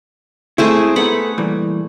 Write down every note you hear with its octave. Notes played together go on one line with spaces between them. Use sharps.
G#3 A3 C4 E4 G#4
B3 D#4 A4 F#5 B5
A#2 E3 G3